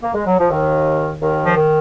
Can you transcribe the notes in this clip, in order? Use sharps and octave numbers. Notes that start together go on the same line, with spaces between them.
A#3
G#3
F#3
F3
D#2 D#3
D#2 D#3
F3
D#3